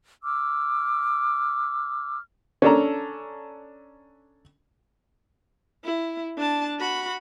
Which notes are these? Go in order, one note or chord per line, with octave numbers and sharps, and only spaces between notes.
D6 E6 F6
C#4 D4 A4 A#5
E4
D4 A5
F#4 B5